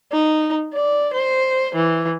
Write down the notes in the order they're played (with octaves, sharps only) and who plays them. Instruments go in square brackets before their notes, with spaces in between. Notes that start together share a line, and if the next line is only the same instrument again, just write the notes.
[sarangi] D#4
D5
C5
E3